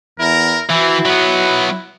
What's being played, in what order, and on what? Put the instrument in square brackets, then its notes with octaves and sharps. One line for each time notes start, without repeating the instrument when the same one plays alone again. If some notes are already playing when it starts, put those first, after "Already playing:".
[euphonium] E2 [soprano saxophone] E4 [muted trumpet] A#4
[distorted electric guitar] E3 [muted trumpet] C4 [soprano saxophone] E4 [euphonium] F#4
[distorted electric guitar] F#3 B3 [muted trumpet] B4